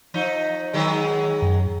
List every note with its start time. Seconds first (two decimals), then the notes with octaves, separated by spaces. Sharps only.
0.14 F3 D#4
0.73 D#3 F#3 G#3
1.42 F#2